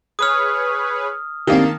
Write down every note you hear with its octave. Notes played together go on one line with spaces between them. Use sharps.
G#4 B4 C#5 D#6 F6
D#3 A#3 C4 D4 G4 A5